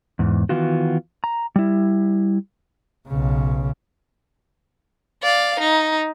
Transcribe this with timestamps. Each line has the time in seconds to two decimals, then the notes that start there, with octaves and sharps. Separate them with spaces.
0.19 E2 G#2
0.49 D#3 E3 B3 F4 F#4
1.24 A#5
1.56 G3 E4
3.09 B1 C#3
5.23 D5 F5
5.59 D#4